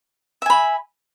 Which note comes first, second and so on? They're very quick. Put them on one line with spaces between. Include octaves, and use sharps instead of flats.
E5 G#5 B5